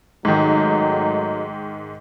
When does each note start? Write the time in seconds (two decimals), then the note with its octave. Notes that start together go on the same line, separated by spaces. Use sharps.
0.25 G#2 D#3 F#3 A3 D#4